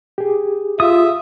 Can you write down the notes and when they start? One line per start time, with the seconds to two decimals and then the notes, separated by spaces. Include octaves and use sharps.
0.18 G4 G#4
0.80 F4 E5 D#6